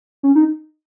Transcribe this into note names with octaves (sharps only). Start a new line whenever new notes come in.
C#4
D#4